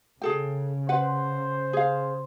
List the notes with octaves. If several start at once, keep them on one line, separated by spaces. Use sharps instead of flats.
C#3 G#4 A4 G5
B4 C5 F#5
G#4 F5